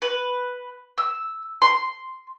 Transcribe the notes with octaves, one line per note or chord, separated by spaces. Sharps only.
B4
E6
C6